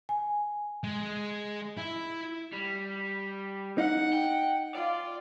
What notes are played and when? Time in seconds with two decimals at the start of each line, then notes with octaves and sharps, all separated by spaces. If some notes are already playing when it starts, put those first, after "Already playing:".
0.09 G#5
0.84 G#3
1.78 E4
2.53 G3
3.78 D#4 F#5
4.13 G5
4.75 F4 D5